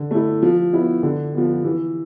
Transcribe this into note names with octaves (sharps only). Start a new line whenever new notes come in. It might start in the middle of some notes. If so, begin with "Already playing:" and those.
Already playing: D3
A3 E4
F3
B3 E4
D3
F3 B3
E3